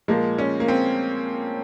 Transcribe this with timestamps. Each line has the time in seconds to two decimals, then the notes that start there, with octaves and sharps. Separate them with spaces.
0.08 A#2 F3 G#3 A#3
0.39 C#4
0.60 A#3
0.68 C4